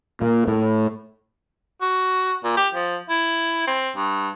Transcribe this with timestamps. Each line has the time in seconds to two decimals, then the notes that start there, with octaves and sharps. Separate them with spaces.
0.22 A#2
0.47 A2
1.81 F#4
2.44 A#2
2.57 G4
2.74 F3
3.10 E4
3.67 C4
3.96 G2